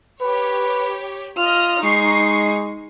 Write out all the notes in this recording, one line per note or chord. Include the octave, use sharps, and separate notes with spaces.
G4 B4 C#5
F4 D#5 F6
G#3 D#4 C#6 C7